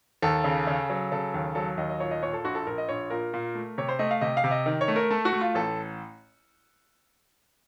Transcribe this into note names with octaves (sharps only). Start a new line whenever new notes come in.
D#2 A4
C#3
C#3
F#3
C#3 A4
D#2
F#3 A4
D#2 D#5
D#5
A#2 C#5
D#5
A#2 C#5
A4
A#1 F#4
A4
A#1 A#4
D#5
A#1 C#5
A#2 A#4
A#2
A3
C3 C#5
C5
A3 D#5
F5
C3 D#5
F5
C3
D#5
D#3
C#5
A3
A#4
A3 A4
F#4
A3
F4
A1 A4